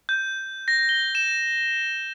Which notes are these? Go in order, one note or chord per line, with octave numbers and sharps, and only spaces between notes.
G6
A#6
G7
E7